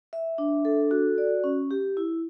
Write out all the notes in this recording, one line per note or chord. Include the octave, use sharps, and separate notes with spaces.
E5
D4
A4
F#4
D5
C#4
G4
E4